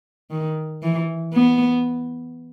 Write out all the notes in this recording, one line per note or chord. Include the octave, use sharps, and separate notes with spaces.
D#3
E3
B3